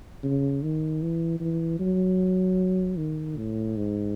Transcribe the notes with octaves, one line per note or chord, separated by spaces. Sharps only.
C#3
D#3
E3
E3
F#3
D#3
A2
G#2